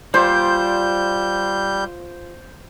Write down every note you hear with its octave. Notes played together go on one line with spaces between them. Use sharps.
G3 F4 C5 D5 G6